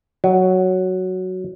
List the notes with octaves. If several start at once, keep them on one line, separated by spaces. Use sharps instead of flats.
F#3